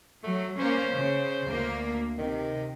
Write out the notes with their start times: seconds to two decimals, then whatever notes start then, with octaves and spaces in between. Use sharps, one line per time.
0.23 F#3 A3
0.60 A#3 C#4 C5
0.95 C#3
1.49 D2 A#3
2.18 C3 D#3